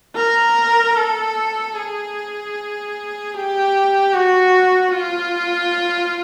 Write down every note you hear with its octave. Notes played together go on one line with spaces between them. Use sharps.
A#4
A4
G#4
G4
F#4
F4